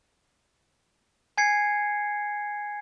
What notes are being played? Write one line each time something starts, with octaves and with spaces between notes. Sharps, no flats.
G#5 G#6 C7 C#7